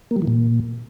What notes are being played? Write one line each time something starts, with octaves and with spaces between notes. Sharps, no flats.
A#3
G3
E3
A#2